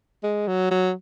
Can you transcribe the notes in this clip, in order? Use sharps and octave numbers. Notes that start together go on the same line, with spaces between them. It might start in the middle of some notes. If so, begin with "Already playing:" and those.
G#3
F#3
F#3